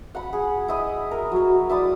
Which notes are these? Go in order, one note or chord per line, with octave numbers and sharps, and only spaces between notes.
F#5 B5
G#4
E4 D#5
A#4
F#3 A#4
E4 D5 D#6